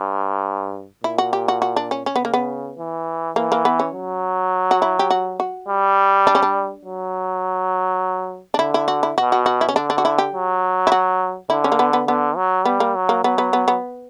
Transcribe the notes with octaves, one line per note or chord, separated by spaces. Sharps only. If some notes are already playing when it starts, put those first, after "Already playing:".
Already playing: G2
A#2 E4
F#4
G4
F#4
F#4
D4
C#4
C#4
B3
C#3 A#3
B3
E3
E3 A#3
A#3
B3
C#4
F#3
F#4
E4
G4
F#4
F#4
G3
D4
C#4
D4
F#3
D4
D3 E4
E4
F#4
E4
B2 F#4
F#4
F#4
E4
C#4
D3 D4
D4
F#4
E4
G4
F#3
E4
F#4
D3 E4
C#4
A#3
B3
B3
D3 B3
F#3
G3 B3
A#3
F#3
A#3
F#3 B3
B3
B3
B3